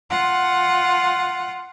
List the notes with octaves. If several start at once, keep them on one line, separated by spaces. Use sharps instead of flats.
F4 F#5